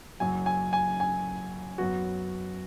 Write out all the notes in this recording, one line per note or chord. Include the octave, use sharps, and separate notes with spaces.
F#1 F#2 F#3 G#5
G#5
G#5
G#5
F#2 F#3 B3 F#4